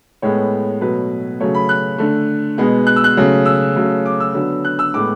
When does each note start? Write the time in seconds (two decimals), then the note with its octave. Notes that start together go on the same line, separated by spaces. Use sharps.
0.22 A2 G#3 B3 C#5
0.81 B2 F#3 A3 B4
1.40 C#3 F#3 A3 C#5
1.54 B5
1.69 F#6
1.98 D3 A3
2.58 B2 G#3 B3
2.87 F#6
2.96 E6
3.04 F#6
3.17 C#3 F#3 A3
3.46 E6
3.76 C#3 F#3 A3
4.06 D6
4.20 E6
4.34 D3 F#3 B3
4.65 F#6
4.79 E6
4.94 A2 G#3 B3 D6